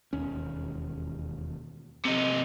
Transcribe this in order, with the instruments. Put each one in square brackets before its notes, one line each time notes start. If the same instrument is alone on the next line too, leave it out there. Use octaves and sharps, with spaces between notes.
[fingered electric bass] E1 D#2 C#4
[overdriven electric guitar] C3 D#4